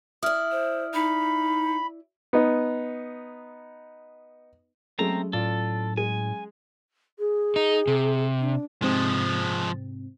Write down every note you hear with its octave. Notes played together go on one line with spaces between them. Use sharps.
E4 D5 D#6 F6
C5
D#4 B5
B3 D#4
F#3 G#3 A3 C4 C#4 A#5
A2 F4 A4 D5
G#3 G#5
G#4
D#4
C3
D4
G#2 C3 F3 G#3 C4